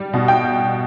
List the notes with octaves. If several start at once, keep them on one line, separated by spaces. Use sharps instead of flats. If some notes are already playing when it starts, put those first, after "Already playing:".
Already playing: G3
B2
G5